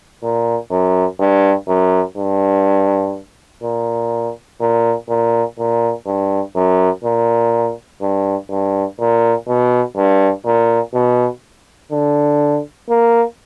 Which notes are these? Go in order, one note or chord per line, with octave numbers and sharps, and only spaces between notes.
A#2
F#2
G2
F#2
G2
A#2
A#2
A#2
A#2
G2
F#2
A#2
G2
G2
A#2
B2
G2
A#2
B2
D3
A#3